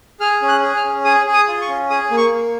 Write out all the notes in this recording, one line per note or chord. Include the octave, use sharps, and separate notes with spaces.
G#4 F6
C#4
F#6
G#4
F6
C#4
G#4 D#6
G#4
D#6
F4
C#6
C#4
G#4 D#6
A#3
C#6
A#3